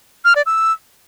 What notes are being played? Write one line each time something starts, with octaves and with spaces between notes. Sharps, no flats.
F6
D5
E6